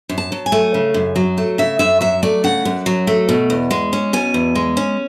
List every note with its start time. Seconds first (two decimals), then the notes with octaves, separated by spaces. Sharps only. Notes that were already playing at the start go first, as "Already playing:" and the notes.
0.09 F#2
0.18 A5
0.32 F#3
0.46 G#5
0.52 A3
0.74 C#3
0.94 F#2
1.16 F#3
1.38 A3
1.58 C#3 E5
1.79 F#2 E5
2.01 F#3 E5
2.23 A3 D5
2.44 C#3 F#5
2.65 F#2
2.86 F#3
3.07 A3
3.29 B2
3.50 E2
3.71 G#3
3.93 C#4
4.13 B2 G#5
4.34 E2
4.55 G#3
4.77 C#4